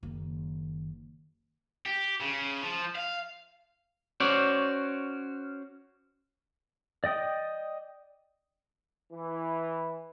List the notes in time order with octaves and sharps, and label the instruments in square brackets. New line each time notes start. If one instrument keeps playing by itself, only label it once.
[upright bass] F#1 D#3
[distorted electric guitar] G4
C#3
F3
F5
[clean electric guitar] C#4 F#4 C5 D5
[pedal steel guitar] D5 D#5 G5 D#6
[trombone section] E3